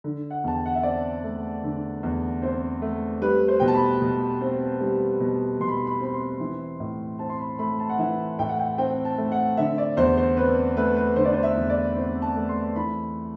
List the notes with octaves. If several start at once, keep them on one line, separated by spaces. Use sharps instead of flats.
D3
F#5
E2 A5
G5
F#5
E5
C4 D5
A3
D3
E2
C4 C5
A3
G3 B4
C5
B2 G5
A5
B5
B2
C4
G3
B2
B2 C6
B5
C6
B5
C4 B5
C6
E3
A2
C4 A5
C6
B5
A3 B5
A5
F#5
E3 E5
A2 G5
F#5
G5
C4 G5
A5
A3
F#5
D3 E5
D5
E2 C5
C5
C4 B4
A3 B4
B4
D3 C5
D5
C5
E5
E2
D5
C4 C5
A5
A3
C6
E3 B5